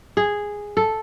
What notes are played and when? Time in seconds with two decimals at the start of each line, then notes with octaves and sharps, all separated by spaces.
0.17 G#4
0.77 A4